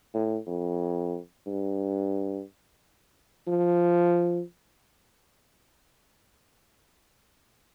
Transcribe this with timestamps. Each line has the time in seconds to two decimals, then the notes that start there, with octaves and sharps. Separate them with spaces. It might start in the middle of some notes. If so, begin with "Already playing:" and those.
0.14 A2
0.47 F2
1.47 G2
3.48 F3